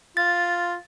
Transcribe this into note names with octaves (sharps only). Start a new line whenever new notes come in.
F4 A6